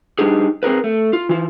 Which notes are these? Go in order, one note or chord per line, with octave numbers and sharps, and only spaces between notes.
G3 D4 D#4 G4 G#4
C4 G#4 A#4 B4
A3
F4
E3 F4